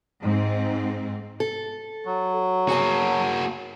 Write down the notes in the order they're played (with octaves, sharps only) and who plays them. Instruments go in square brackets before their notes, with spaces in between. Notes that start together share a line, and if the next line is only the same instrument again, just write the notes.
[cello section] G#2 C4
[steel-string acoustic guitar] A4
[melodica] F#3
[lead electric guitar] A#3 F#4 [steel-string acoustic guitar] G#4 G#5 A5